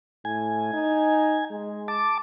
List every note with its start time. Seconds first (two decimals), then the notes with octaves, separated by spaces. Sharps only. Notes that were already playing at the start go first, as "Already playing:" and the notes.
0.25 A2 G#5
0.73 D#4
1.51 G#3
1.88 A5 D6